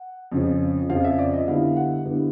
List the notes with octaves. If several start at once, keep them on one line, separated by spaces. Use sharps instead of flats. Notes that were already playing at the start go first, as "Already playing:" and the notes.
Already playing: F#5
F2 C#3 F3
F2 C#3 F3 F5
E5
D5
D#5
D3 G3 B3 E4 F5
F#5
D3 G3 B3 E4